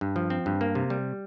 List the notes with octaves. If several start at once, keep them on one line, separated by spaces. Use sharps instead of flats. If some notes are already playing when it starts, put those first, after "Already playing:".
G2
F3
C4
G2
A#3
C3
G3